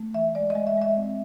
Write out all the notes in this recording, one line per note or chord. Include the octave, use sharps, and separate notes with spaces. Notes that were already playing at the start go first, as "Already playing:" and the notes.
Already playing: A3
E3 E5
G#3 D5
D#5
G#3
E5
G#3 E5
C4